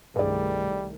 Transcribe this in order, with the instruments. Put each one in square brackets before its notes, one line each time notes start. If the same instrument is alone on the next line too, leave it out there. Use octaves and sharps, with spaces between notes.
[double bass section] C2 D#3 A3 [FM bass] G2 [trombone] G3 [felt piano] G#4 D5